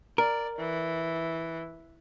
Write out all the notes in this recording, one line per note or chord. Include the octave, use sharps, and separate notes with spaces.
A#4 D5
E3